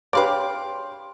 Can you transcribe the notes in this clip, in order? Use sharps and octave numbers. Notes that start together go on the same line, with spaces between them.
D4 G4 G#4 B4 C#5 F5 C6 D6